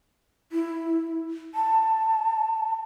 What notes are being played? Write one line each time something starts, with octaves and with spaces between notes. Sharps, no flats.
E4
A5